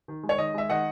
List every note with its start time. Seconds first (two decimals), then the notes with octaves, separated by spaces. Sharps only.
0.08 D#3
0.23 G#3
0.29 C#5
0.38 D#3 D#5
0.54 G#3 E5
0.70 D#3 D#5 F#5